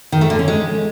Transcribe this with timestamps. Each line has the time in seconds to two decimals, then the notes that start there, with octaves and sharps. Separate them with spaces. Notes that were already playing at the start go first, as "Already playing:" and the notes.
0.12 D#3
0.21 A3
0.30 D3
0.39 C#4
0.48 G#3